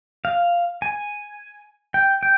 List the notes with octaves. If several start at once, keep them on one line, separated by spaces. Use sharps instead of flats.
F5
G#5
G5
G5